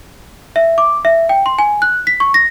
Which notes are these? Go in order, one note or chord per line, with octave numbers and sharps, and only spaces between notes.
E5
D6
E5
G5
C6
G#5
F#6
B6
C#6
A#6